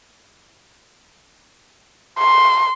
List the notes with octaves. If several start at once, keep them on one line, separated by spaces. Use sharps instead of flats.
C6